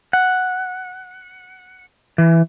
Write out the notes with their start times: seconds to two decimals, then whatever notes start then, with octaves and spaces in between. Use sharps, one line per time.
0.13 F#5
2.18 E3